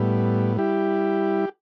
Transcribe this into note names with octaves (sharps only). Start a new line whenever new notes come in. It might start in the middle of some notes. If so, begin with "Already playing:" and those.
Already playing: A2 G3 B3
G3 E4 G4